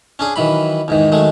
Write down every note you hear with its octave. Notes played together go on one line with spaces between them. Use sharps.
C#4 D4 G#4
D#3 E3 F#3 B5
E2 G#2 D#3
D#3 F#3 G#3 A3